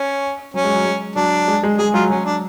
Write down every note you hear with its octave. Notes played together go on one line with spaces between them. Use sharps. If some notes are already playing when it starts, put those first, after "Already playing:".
Already playing: C#4
F#3 C#4
G#3
F#3
G#3
F#3 D4
G#3
G#3
G#3 G#4
F#3 F4
F#3 C#4
D4